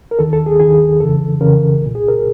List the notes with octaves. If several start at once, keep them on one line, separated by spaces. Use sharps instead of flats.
A#4
D#2 D#3 A4
A4
G#4
D#2 D#3 G#4
F2 C#3 E3 A4
F2 C#3 E3 A#4
C2 A#2
G#4
A#4